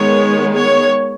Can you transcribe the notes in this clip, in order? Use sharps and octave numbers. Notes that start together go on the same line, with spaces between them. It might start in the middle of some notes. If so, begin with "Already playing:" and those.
Already playing: D#3 G#3 B3 C#5
C#5